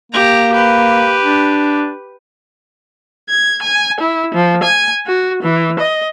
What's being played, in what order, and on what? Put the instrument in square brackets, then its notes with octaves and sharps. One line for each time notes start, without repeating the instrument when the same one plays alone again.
[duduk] A#3 [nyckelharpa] G4 A#5
[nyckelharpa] G4 B4
[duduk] D4
[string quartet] G#6
G#5
E4
F3
G#5
F#4
E3
D#5